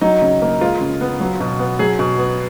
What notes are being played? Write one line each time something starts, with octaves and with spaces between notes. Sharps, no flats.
F#3 D#4
C#3
A#3
G#3 F4
C#3
B3
F#3
B2
B3
F#3 G#4
B2
B3